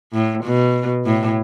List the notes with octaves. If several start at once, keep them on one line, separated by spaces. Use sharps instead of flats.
A2
B2
A2